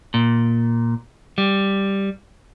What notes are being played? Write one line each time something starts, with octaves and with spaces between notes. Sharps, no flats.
A#2
G3